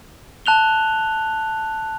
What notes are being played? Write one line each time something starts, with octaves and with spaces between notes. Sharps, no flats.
A5 F#6 F7 G7